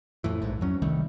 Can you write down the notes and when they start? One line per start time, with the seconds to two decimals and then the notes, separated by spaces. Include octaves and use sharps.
0.24 F2 A2 E3
0.42 A#1 G#2
0.61 F2 F#3 C#4
0.82 C2 D#3 G3 A3